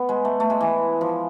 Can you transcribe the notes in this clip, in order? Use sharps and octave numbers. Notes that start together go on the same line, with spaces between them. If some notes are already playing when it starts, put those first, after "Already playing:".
Already playing: B3
G#3
A3
A3
G#3
E3
F3